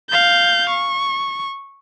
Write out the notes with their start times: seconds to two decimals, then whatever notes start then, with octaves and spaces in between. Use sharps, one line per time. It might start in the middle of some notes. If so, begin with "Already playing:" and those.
0.10 F5 G6
0.70 C#6